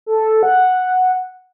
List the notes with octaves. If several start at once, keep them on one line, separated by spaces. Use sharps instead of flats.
A4
F#5